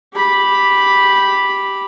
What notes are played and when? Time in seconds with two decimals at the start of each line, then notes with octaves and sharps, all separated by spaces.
0.14 G4 B5